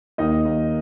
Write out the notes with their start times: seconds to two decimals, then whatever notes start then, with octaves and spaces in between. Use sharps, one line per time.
0.18 D#2 D#4 D#5
0.45 D#2